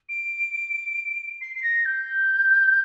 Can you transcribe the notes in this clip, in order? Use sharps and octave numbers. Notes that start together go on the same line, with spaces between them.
D7
C7
C7
A#6
G6